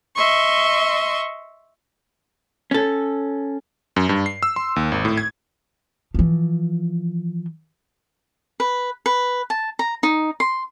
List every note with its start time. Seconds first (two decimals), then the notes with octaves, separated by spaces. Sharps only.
0.16 D#5 E5 C6 C#6
2.71 C#4 A4
3.96 F#2
4.09 G2
4.26 C7
4.43 E6
4.56 C6
4.76 D#2
4.92 G#1
5.05 A2
5.17 G#6
6.14 E3 F3
8.60 B4
9.06 B4
9.50 A5
9.79 A#5
10.03 D#4
10.40 C6